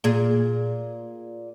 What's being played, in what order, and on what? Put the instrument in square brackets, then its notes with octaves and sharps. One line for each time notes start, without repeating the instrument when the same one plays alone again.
[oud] A#2 G#4